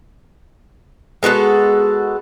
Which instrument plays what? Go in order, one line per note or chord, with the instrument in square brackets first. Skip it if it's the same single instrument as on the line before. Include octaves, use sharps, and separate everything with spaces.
[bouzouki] G#3 B3 F#4 A4